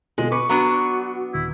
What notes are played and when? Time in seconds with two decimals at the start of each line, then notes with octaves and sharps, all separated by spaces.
0.18 B2 G#3 F4 A4
0.32 B4 C#6 D6
0.49 F#3 B3 D4 F#4
1.34 D#1 E4